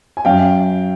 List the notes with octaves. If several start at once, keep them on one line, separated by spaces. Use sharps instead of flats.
G#5
F#2 F5 G5